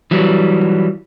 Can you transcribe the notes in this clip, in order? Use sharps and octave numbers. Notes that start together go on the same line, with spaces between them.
E3 F#3 G3